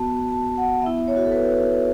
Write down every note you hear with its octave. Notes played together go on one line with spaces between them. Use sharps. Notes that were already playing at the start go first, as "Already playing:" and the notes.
Already playing: B3 F#4 A5
A5
F#5
B3 E4 E5
C#5
F#4
A4
B4